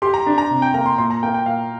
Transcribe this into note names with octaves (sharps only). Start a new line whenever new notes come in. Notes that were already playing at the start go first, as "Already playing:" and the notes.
G4 C6
A#5
D4
A#5
C3
G5
A#3 A#5
C6
A#2 C6
A#5
A#3 G5
G5
A#2 F5